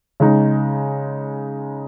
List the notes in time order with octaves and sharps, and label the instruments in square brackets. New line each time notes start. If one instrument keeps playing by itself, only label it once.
[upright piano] C#3 G#3 D#4